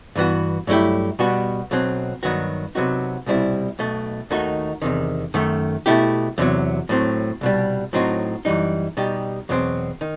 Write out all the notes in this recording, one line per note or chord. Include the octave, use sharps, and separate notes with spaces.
G2 E3 B3 F#4
G2 F#3 A3 E4 G4
B2 G3 B3 F#4
B1 B2 F#3 C4
G2 D#3 F#3 B3 F#4
C3 F#3 B3 D#4 F#4
C2 B2 G3 C4 E4
B1 B2 A3
D#2 D#3 A3 D#4 F#4
E2 C3 D#3
F#2 D#3 A3
B2 A3 E4 G4
E2 C3 D#3 F#3
A2 F#3 C4
C2 B2 G3
A2 F#3 C4 D#4 F#4
F#2 E3 G3 D#4
B2 G3 D#4 G4
E2 B2 F#3 C4
D#3